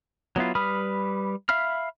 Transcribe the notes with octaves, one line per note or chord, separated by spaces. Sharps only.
F#3 B3 E4 F4
G3 B4 B5 D#6 F6
E5 F5 B5 F6